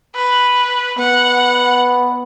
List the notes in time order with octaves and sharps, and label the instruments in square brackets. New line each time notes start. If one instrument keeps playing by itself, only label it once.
[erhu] B4
[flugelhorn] B3 [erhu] F#5